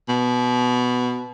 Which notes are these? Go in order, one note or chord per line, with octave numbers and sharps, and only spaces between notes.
B2